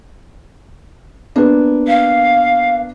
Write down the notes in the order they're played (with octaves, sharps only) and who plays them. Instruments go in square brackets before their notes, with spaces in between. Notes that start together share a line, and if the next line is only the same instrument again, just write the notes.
[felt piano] A#3 B3 D4
[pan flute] F5